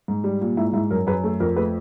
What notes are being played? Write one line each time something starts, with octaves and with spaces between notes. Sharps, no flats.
G#2
G3
A#2
G#2 E4
G#2 E4
F#2 A#4
F#2 B4
A3 A4
F2 A#4
A3 B4